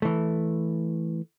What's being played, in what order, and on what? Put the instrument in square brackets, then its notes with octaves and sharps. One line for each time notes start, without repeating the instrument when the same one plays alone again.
[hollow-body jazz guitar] E3 A3